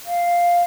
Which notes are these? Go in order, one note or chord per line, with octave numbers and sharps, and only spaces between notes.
F5